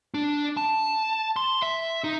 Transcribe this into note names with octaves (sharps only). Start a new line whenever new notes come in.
D4
A5
C6
E5
D#4